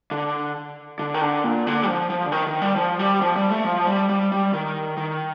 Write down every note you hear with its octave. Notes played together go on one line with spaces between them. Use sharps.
D3
D3
D#3
D3
A#2
D3
G3
F3
F3
D3
D#3
D#3
G3
F3
G3
F3
G3
A3
F3
G3
G3
G3
D#3
D#3